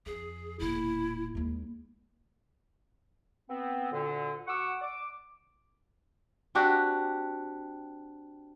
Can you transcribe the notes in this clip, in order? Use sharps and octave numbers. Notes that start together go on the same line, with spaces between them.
F2 G#4
E1 A#2 E4
D#2 G#3
B3 C4
D2 A#2 D3
F#4 F#5 C#6 D6 E6
D6
C4 D4 F#4 G4